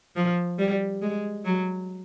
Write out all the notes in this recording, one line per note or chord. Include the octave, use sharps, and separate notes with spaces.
F3
G3
G#3
F#3